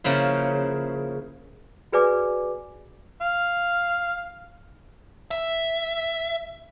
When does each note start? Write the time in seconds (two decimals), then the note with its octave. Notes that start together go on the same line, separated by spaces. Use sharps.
0.04 C#3 F3 A#3 E4
1.92 F#4 G#4 B4 D5 G#5 D6
3.21 F5
5.31 E5